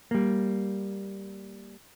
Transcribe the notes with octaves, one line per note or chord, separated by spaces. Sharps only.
G3 A#3